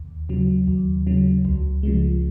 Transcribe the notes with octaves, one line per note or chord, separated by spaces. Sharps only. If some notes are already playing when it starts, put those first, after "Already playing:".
Already playing: D#2
C#3 F#3
D#2
C#3 F#3
C#2
C#3 F3 G#3